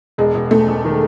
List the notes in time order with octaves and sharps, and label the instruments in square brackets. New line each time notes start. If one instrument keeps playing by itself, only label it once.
[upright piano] E1 [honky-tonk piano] G#3
[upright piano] E1
[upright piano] E1 [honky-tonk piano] A3
[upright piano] E1
D#3